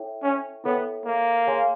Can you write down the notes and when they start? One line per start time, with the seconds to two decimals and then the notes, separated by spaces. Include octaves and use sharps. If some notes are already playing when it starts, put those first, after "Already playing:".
Already playing: E4 A4 C#5 E5 G5
0.22 C#4
0.64 B3 E4 A4 C#5 E5 G5
1.06 A#3
1.47 G#4 C#5 F5 G#5 C6